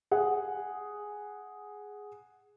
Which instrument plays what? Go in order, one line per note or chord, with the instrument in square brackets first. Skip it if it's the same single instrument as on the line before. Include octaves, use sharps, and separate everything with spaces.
[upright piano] G#4 F#5